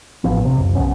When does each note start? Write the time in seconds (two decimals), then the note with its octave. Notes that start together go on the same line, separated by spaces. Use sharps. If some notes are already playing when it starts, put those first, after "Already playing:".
0.24 A1 F3 B3
0.45 C3
0.57 F#1 C#2
0.75 C2 F3 B3 C#4